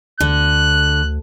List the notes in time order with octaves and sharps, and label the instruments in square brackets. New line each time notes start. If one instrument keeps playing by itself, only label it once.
[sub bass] D2 [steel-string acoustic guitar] D3 [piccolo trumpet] F#6